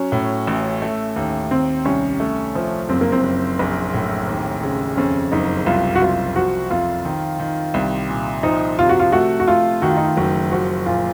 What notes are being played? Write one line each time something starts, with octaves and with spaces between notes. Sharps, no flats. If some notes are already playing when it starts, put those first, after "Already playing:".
Already playing: F#3 C#4
A2
A1
A3
D#2
D#3 C4
C2 C#4
A3
F3
F#1 C4
A#3
C4
F#1
A#1
A2
D#2
C#3
F2 C#4
F#1 D#4
C2 F4
F#4
C2 F4
F3 F#4
F2 F4
D#3
D#3
C2
A#2
F3 D#4
C3 F4
F#4
F4
A3 F#4
F#4
A3 F4
D#3 F#4
F4
D#4
F4
F#1 F#4
F3 F#4
A#2 F4